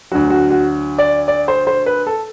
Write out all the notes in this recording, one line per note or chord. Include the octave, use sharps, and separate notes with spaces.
D2 D3 F#3 F#4
F#4
F#4
D5
D5
C5
C5
B4
A4